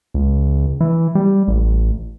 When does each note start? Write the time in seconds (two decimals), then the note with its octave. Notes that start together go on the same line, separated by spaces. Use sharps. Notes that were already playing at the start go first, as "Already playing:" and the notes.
0.14 C#2
0.81 E3
1.15 G3
1.48 A1